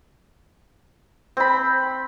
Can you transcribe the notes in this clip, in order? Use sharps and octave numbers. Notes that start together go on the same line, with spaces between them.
C4 B5